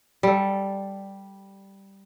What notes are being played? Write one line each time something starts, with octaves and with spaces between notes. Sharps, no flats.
G3 A4